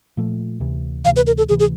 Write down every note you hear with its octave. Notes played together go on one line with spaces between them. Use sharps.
A#2 F3 A3
D2 C3 E3
D2 C3 E3 F5
B4
A#4
A4
D2 C3 E3 G#4
G#4